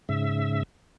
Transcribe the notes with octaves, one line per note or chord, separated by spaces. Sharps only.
G#2 C#3 E5